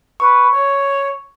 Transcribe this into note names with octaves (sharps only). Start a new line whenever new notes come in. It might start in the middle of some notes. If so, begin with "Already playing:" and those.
B4 C#6
C#5